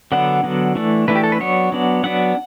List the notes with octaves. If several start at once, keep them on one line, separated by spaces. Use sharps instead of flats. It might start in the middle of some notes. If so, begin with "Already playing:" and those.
D3 F#3 B3 D4 F#5
D3 F#3 B3 D4
E3 A3 D4
E3 A3 D4 B4
G4
A4
B4
F#3 B3 D4 C#5
F#3 B3 D4
F#3 B3 D4 F#5